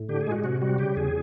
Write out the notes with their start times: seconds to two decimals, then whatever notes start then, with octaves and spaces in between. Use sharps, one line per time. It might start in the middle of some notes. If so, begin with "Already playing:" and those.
Already playing: A2
0.09 D3 G4
0.21 G#4
0.27 G#3
0.32 F#4
0.44 C3 F#4
0.62 G3 F#4
0.78 C#3 G4
0.96 E2 G#4